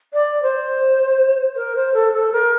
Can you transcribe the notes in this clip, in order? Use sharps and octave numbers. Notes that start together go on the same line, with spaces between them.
D5
C5
A#4
C5
A4
A4
A#4